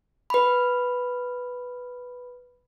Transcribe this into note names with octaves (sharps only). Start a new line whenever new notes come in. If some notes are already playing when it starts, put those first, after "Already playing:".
B4 B5